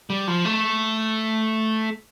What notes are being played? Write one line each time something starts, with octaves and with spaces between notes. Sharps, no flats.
G3
F3
A3